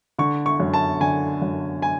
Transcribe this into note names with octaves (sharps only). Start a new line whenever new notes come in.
D3 C#6
C#6
F#2
A5
D3 G#5
F#2
G#5